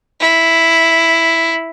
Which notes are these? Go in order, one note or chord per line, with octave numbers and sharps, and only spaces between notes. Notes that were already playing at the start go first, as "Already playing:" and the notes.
E4